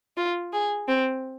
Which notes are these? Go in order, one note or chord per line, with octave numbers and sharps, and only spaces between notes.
F4
G#4
C4